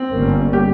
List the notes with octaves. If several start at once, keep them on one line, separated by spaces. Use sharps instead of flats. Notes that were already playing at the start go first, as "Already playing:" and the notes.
Already playing: C4
G1 G2 G3 A#3 C#4
G4